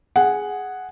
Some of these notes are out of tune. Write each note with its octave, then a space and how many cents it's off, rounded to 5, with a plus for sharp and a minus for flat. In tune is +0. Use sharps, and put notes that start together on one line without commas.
G#4 +0 F#5 +0